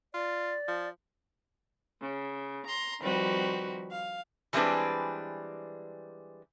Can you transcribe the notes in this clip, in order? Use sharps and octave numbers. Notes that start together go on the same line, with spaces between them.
F4 D5
F3
C#3
A#5 C6
D#3 F3 G3 C4 F#4 B4
F5
E3 G3 G#3 C4 D4 B4